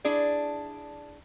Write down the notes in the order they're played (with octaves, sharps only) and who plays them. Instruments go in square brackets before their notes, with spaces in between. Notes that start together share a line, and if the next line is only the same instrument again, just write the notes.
[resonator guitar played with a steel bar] D4 E4 G#4 D5